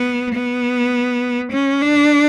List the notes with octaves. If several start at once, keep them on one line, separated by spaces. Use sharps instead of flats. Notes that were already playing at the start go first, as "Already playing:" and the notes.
Already playing: B3
B3
C#4
D4